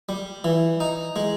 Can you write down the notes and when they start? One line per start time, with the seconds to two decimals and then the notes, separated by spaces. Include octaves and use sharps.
0.09 G3
0.44 E3
0.80 D#4
1.16 G#3